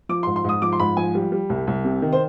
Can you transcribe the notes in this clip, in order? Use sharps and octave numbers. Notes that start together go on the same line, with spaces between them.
F3 D6
G#2 C6
C6
G#2 D#6
F3 D6
C6
G#2 B5
F3 G#5
G3
G3
C2
C2
C3
D#3
C5